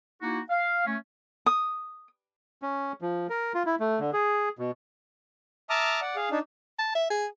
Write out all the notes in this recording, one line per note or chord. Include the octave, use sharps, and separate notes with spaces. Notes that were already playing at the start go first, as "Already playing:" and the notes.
A#3 D#4 E4 F#4
F5
A3 C#4
D#6
C#4
F3
A#4
F4
E4
A3
D3
G#4
B2
E5 A5 A#5 D6 D#6 F6
D5 F#5
G#4 F5
D4 D#4
A5
E5
G#4